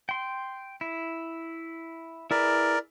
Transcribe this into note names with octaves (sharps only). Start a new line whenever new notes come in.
G5 C6
E4
E4 G#4 A#4 B4 D5